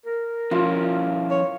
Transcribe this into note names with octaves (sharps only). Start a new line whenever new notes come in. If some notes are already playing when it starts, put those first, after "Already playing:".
A#4
F3 C#4 E4 F4
C#5